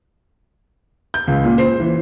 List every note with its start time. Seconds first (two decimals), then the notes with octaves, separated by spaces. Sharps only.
1.14 G6
1.27 C#2
1.44 A#2
1.58 C5
1.80 E3